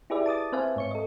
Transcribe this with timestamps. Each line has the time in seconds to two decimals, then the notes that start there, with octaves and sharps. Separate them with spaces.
0.10 E4 G4 G#4 B4 D5 E5
0.26 A5 D6 D#6 A6
0.52 C4 B4 C5 E5 F5 G#5
0.76 G#2 C#5 C#7
0.91 A4 D#5